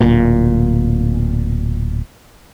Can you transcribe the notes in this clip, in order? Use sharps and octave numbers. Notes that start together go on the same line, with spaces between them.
D1 A#2